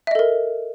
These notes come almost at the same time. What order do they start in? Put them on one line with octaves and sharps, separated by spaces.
E5 D#5 A4 A#4